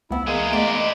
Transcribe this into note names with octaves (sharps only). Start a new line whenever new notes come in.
C#2 B3 C4 E4
E3 G#3 A#3 G#4
A3 B3 B4 D5 D#5